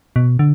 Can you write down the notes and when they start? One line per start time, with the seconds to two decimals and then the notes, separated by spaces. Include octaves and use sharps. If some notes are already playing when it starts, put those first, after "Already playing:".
0.16 B2
0.39 D3